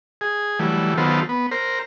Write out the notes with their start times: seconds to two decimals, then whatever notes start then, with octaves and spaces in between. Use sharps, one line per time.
0.21 G#4
0.60 E3 F#3 G3 A3
0.98 D#3 F#3 B3 F4 A4 C5
1.29 B3
1.51 A#4 C5